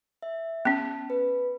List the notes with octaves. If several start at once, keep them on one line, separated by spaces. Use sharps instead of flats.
E5
B3 C#4 A5
B4